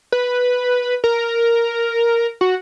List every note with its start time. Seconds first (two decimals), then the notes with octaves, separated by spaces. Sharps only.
0.12 B4
1.04 A#4
2.41 F#4